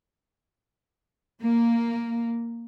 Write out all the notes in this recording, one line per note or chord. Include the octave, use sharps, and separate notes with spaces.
A#3